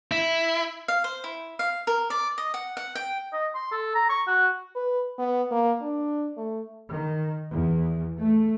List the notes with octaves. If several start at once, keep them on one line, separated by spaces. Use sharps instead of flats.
E4
F5
C5
E4
F5
A#4
D5
D#5
F#5
F#5
G5
D#5
C6
A4
A#5
C#6
F#4
B4
B3
A#3
D4
A3
D#3
E2
A3